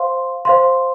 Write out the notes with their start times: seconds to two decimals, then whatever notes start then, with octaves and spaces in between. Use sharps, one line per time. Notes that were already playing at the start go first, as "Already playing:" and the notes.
Already playing: C5 F5 C6
0.45 C5 F5 C6